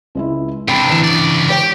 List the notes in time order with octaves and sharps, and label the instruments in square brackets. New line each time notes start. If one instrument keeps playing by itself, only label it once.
[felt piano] C#2 G#3 E4
[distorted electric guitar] C3 D4 [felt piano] G5 B5
[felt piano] D3 E3 E7
[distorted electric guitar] C#2 D5
[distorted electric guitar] G4 [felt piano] B4 C#5 G5